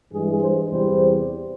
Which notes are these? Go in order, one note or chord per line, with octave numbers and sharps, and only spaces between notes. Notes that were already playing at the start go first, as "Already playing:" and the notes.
G2 E3 G#3 G#4
C5
E2 C3 G3 C5